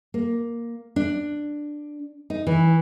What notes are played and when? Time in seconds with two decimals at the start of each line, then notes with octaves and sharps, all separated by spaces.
0.14 A#3
0.96 D4
2.30 D#4
2.47 E3